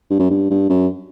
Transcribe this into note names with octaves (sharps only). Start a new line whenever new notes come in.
G2
F#2
G2
G2
F#2